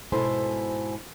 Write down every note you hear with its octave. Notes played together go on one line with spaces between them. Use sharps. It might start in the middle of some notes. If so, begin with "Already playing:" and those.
G#2 B2 E4 A4 C5 G#5